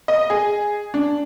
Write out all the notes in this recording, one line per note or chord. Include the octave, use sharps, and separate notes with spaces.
D#5
G#4
D4